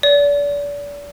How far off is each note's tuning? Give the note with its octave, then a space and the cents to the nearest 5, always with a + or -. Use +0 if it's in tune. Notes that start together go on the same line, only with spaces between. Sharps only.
D5 -35